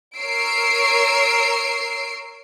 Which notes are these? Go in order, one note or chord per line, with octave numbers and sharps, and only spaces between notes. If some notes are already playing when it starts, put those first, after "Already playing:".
A#4 C#5 E6 C7 D7